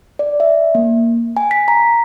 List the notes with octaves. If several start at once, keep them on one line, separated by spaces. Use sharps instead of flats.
D5
E5
A#3
G#5
B6
A#5